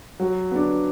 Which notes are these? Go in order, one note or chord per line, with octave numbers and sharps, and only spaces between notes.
F#3
B3 D4